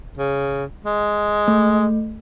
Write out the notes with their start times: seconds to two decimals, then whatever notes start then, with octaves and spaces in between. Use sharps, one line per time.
0.18 C#3
0.86 G#3
1.48 A3